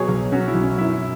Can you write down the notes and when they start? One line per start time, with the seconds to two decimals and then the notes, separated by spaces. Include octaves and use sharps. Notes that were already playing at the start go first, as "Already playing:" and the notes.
Already playing: B2 F#3 G#4 C#5
0.08 B1
0.32 F#3 C#4 F#4
0.48 E4
0.55 B1
0.63 C#4
0.78 F#2 E4